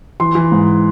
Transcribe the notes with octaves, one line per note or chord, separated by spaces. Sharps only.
E3 C6
E3
G#2